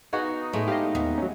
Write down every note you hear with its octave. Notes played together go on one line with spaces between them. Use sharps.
B3 D#4 F#4 G#4
A2 G#3 A3
G4 D#5 F5
D#2 B3
F#3 C#4